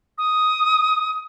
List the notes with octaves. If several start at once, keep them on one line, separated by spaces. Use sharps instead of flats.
D#6